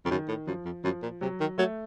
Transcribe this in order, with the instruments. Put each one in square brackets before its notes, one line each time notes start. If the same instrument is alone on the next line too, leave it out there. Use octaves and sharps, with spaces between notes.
[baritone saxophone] F2 [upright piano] C#3
[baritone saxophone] F#2 [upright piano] D#3
[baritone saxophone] A2
[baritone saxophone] F#2 [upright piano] F3
[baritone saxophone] F2
[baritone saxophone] F#2 [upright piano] F3
[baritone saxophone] A#2
[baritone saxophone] C3 [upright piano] F#3
[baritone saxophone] D#3
[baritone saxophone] F#3 [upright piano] A3